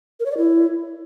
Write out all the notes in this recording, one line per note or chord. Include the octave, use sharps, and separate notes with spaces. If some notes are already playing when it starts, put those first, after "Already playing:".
A#4
C#5
D5
E4